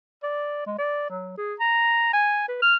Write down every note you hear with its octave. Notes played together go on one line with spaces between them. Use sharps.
D5
G#3
D5
F#3
G#4
A#5
G#5
B4
F6